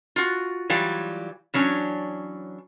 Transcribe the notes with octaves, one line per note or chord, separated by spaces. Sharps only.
F4 F#4
E3 F#3 G3 F4
E3 F#3 C#4 D4